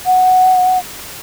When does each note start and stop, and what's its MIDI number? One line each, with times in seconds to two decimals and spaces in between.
0.06 0.78 78